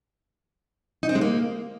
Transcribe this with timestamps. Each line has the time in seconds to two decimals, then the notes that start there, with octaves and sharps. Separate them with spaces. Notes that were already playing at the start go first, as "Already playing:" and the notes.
1.03 D#4
1.09 C4
1.15 G#3
1.21 A#3